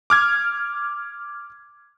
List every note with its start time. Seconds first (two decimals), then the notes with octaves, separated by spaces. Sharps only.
0.10 D6 F6 G#6